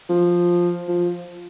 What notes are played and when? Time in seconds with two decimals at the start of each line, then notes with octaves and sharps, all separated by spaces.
0.09 F3
0.88 F3